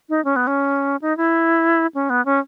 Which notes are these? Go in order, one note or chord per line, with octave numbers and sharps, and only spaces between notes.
D#4
C#4
B3
C#4
D#4
E4
C#4
B3
C#4